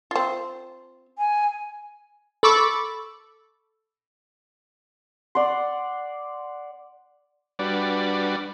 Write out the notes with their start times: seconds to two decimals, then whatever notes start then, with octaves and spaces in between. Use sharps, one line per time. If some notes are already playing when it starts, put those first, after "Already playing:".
0.11 C4 F4
1.18 G#5
2.43 A4 B5 C#6 D6 E6
5.35 D5 F#5 C6
7.59 G3 D4 F#4 B4 D5